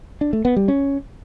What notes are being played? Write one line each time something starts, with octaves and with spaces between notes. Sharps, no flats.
D4
A3
B3
G3
C#4